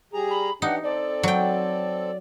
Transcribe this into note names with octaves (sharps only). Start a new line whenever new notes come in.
G3 G#4 A#5
B5
E3 D4 D#4 G4 F#5
C4 A4 D5
F#3 G5